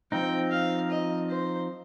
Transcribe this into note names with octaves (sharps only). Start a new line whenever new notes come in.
F3 C4 D#4 G5
F5
D#5
C5